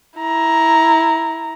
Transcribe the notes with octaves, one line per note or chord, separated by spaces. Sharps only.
E4 A#5